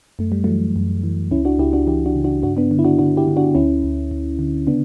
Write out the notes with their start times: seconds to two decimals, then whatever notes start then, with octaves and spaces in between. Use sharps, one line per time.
0.19 F#2 A3
0.32 G3
0.44 E3 F#3 A3
0.76 F#2
1.03 E3
1.31 C#2 C#4 E4
1.45 D4 F#4
1.59 C#2 E4 G4
1.73 D4 F#4
1.87 E3 E4 G4
2.06 D4 F#4
2.15 C#3
2.24 D4 F#4
2.43 G2 D4 F#4
2.57 B3 D4
2.71 D3
2.79 E4
2.85 D4 F#4
2.99 D3 D4 F#4
3.17 E4 G4
3.27 D3
3.37 D4 F#4
3.55 D2 C#4 E4
3.84 D2
4.11 D2
4.39 D3
4.67 C#3 B3 D4